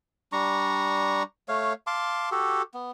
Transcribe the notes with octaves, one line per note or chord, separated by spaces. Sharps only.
G3 D4 A#5 C#6
A3 C#5 F5
F5 A5 C6 D6
F#4 G4 A4
B3